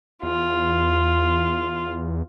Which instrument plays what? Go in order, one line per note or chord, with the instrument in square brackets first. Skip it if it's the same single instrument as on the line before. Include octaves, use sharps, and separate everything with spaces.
[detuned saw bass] E2 [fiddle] F4